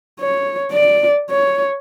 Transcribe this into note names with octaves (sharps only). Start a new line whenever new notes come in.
C#5
D5
C#5